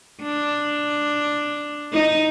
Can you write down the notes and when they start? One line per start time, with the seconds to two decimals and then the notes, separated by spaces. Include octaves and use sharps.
0.23 D4
1.93 D#4